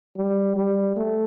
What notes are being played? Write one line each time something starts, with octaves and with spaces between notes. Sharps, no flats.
G3
G3
A3